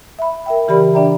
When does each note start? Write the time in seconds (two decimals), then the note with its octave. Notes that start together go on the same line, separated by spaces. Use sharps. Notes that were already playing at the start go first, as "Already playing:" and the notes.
0.19 E5 B5
0.46 A#4 E5 G5
0.68 C#3 E3 G4 A#4 D5 B5
0.94 D4 D5 E5 G5 A#5